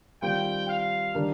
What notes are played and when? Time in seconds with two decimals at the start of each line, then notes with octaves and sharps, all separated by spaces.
0.21 D#3 G3 C4 F4 G5
0.67 F5
1.15 D#3 G3 D4